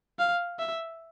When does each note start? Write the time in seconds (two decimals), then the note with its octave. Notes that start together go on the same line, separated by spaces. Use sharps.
0.19 F5
0.60 E5